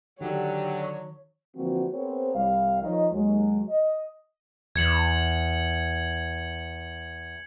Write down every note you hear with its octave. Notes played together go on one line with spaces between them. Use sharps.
D3 D#3 F#3 G4 C#5
D3 E3 F3 A#3 C4 F#4
B3 C4 G#4 A#4 C5 C#5
C2 G3 F5
D#3 F3 C#5 D#5
D#2 F#3 G#3
D#5
E2 G#6 C#7 F#7